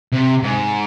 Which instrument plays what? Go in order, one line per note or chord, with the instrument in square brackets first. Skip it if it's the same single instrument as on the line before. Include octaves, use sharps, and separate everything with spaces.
[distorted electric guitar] C3
G#2